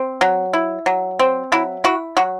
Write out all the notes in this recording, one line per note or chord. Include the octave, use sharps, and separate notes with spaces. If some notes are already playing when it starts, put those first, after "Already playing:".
Already playing: C4
F#3
E4
F#3
C4
F#3 E4
E4 F#4
F#3 F#4